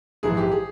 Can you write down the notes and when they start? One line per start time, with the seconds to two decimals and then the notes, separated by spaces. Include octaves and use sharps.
0.23 A#1 G#2 E3 G#4
0.37 G4
0.52 G#4